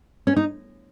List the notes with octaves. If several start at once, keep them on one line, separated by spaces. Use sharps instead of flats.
C#4
D#4